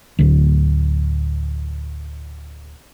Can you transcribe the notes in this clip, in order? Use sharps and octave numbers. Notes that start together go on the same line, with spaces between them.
D1 D2